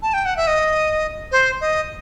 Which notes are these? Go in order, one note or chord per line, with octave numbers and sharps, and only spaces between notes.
A5
G5
F#5
E5
D#5
C5
D#5